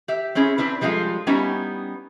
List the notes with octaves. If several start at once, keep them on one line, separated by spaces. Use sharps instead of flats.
G4 E5
C4 C#4 E4 G#4
C4 D4 E4 B4
F3 G3 G#3 E4 F4 A4
G3 B3 C#4 D#4 E4 G4